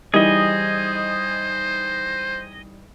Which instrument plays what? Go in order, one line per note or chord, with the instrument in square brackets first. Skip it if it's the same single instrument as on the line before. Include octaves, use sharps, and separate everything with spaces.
[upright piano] E3 G3 D#4 [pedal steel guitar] G#4 D#5 [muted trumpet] C5